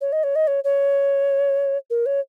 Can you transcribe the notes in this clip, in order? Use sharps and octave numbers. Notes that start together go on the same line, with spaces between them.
C#5
D#5
C#5
D#5
C#5
C#5
A#4
C#5